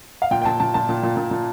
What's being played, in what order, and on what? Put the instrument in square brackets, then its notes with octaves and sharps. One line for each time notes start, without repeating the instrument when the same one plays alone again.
[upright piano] F5
A#2 G5
G5
A#2 A5
A#2 A5
A#2 A5
A#2
A#2
A#2
A#2